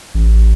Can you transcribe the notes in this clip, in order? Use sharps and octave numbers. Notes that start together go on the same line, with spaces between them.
A1